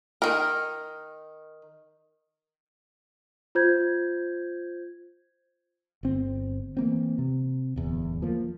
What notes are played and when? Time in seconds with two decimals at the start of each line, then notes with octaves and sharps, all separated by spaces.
0.22 D#3 A#4
3.55 F4 C5 G6 G#6
6.03 G1 C4
6.77 E3 A#3 C4
7.18 C3
7.76 D1 E2
8.22 F3 A#3